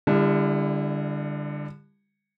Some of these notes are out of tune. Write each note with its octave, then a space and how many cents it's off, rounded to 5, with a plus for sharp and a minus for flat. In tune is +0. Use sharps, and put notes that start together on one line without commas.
D3 +0 G3 +40 E4 +35